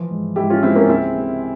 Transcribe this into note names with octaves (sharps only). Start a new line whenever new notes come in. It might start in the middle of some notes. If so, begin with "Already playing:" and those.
Already playing: E3 F3
G#2
G#2 E4 G4
C#4 F4
G#3 C4 E4
A#3 C#4
C#2 C4 E4
C3